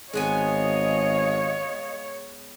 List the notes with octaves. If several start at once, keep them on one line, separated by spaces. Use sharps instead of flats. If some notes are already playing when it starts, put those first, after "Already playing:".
G#1 G#3 B3 C#5 D#5 F5 G#5